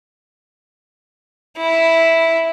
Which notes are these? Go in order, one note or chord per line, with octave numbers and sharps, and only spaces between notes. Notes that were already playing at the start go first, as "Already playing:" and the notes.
E4